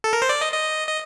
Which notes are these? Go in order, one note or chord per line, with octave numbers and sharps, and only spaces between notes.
A4
A#4
C5
D5
D#5
D#5
D#5